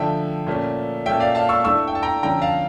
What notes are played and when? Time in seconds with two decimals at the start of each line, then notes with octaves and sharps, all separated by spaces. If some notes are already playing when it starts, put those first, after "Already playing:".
Already playing: D3 F3 A3 E5 G5
0.47 A#2 A3 C#4
1.06 A#2 A3 C#4 E5 G5
1.20 D5 F5
1.35 F5 A5
1.49 C#6 E6
1.64 E3 A3 D4 C#6 E6
1.88 G5
1.95 A5
2.03 G5 A#5
2.23 D3 F3 C#4 G5 A#5
2.42 F5 A5